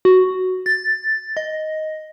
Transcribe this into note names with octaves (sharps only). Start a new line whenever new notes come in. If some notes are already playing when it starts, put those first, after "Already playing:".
F#4
A6
D#5